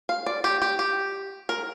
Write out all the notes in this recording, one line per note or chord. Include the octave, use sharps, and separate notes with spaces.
F5
D5
G4
G4
G4
A#4